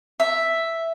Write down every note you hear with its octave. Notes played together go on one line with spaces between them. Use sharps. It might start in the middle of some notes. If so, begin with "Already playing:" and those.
E5